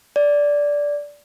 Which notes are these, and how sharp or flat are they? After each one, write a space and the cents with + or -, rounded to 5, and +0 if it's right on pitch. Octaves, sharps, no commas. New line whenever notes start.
D5 -10